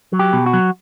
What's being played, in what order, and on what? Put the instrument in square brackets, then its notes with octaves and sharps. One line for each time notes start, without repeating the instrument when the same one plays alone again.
[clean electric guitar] F#3
G4
B2
F#4
F#3